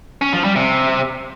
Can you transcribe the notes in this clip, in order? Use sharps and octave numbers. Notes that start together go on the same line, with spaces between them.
C#4
F3
G3
C3